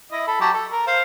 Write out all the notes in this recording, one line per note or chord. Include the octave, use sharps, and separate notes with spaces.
E4 D#5
A4 B5
F#3 G4 A5
A4
A#4
C5 F5